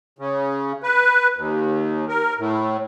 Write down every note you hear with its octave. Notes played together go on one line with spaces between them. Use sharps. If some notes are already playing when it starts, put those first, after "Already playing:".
C#3
B4
D#2
A#4
A2